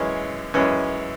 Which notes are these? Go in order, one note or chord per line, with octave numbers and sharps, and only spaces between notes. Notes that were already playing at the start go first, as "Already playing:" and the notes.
Already playing: F#2 E3 G#3 C#4
F#2 E3 G#3 C#4